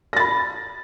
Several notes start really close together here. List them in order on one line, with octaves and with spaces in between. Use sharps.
A#6 A6 B5